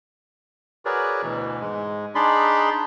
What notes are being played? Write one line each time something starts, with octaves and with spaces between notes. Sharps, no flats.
F#4 G#4 A#4 B4 C#5 D5
D2 B2 E3
G#2 G#3
D4 D#4 G#4 D5 B5 C6